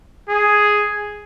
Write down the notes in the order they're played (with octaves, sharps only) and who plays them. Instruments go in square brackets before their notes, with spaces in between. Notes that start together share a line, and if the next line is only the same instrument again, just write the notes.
[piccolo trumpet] G#4